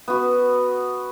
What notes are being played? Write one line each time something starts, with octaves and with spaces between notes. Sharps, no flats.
B3 F#4